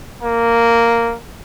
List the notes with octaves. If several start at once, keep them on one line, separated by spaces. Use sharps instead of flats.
A#3